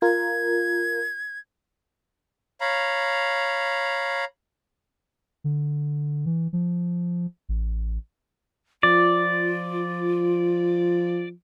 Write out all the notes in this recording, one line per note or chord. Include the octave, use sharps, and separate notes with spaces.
F4 A#4 G#6
C#5 F5 A#5 B5
D3
E3
F3
A1
F3 F4 D5